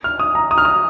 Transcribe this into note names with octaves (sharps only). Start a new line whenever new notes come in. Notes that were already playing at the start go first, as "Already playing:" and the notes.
F6
D#6
A#5
D#6
F6
D#6